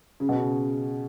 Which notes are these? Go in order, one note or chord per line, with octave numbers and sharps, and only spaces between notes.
C#3
B2
C#3